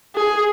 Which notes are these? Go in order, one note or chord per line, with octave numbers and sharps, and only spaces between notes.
G#4